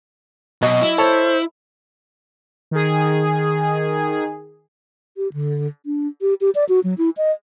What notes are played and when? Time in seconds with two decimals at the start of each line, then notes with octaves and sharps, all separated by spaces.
0.62 B2 F#3 D#5 G#5
0.81 E4
0.98 A4 C5 C#5
2.71 D#3 G#4
5.17 G4
5.33 D3
5.86 D4
6.22 G4
6.41 G4
6.55 D5
6.69 F#4
6.84 F#3
6.98 E4
7.17 D#5